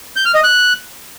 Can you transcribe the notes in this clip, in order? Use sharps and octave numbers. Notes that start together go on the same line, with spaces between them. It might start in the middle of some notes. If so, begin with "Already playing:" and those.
G6
F6
D#5
F#6